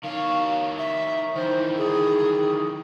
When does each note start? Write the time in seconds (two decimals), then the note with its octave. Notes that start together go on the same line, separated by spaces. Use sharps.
0.04 D#3 C#5 F5
0.78 E5
1.36 D#3 E3 C5
1.78 G#4